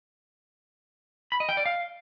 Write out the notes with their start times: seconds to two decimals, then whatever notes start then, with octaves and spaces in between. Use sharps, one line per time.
1.32 B5
1.40 D#5
1.49 G5
1.57 D5
1.66 F5